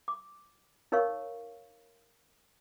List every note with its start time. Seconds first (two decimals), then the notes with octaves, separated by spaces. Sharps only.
0.08 D6
0.92 D#4 A#4 C#5 F5 C#6